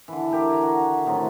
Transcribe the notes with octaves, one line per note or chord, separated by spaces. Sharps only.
D3 E3
G4 A#4 E5
G#5 A#5
F#4
A2 C3 D#3 F#3